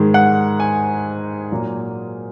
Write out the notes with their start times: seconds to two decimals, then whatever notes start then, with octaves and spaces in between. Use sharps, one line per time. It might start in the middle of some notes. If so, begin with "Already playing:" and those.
Already playing: G#2 D#3 G#3
0.14 F#5
0.60 G#5
1.52 A#2 F#3 A#3